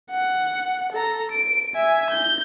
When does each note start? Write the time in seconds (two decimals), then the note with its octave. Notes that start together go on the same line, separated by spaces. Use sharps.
0.10 F#5
0.92 A4 A#5
1.32 D7
1.75 E5 G#5
2.11 G6